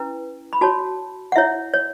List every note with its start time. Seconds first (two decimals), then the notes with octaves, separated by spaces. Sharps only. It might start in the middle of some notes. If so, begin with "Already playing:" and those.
Already playing: C#4 E4 B4
0.53 B5
0.61 F#4 C#5 A5
1.32 F#5
1.36 E4 C#5 E5
1.74 C#5